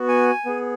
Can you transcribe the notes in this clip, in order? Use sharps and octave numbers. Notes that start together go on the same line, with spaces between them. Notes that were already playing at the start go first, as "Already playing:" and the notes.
Already playing: B3 F#4
G#5
B3 G#4